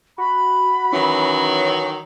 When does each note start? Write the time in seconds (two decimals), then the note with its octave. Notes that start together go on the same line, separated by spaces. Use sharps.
0.18 F#4 B5
0.93 D#3 E3 F#3 C#4